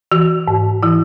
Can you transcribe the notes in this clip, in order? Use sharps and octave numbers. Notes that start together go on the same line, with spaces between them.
E3 F#4
G#2
E3 E4